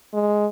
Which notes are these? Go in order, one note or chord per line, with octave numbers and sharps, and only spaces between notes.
G#3